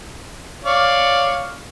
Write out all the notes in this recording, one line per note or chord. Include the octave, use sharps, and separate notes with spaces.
C#5 D5 F5